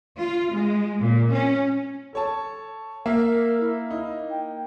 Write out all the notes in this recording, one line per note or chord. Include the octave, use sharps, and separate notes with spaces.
F4
G#3
A#2
C#4
A4 C#5 A5
A#3 A#4 E5 F5
E4
D#4
G5